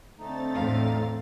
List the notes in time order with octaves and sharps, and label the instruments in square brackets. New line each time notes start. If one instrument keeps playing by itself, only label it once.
[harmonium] D3 A3 D#4 [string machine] C4 A6
[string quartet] E2 A2 F5